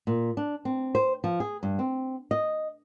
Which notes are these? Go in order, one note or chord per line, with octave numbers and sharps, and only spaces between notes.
A#2
D4
C4
C5
F3
G#4
G2
C4
D#5